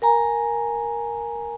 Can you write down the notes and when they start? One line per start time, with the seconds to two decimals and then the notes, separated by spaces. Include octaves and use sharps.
0.02 A#4 G#5 A#5